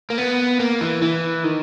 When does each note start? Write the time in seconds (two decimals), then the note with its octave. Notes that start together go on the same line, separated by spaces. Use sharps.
0.10 A#3
0.18 B3
0.60 A#3
0.81 E3
1.02 E3
1.44 D#3